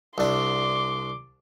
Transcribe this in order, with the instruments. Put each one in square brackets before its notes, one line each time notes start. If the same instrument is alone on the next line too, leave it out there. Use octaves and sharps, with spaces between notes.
[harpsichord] C2 D4 [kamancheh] C6 D6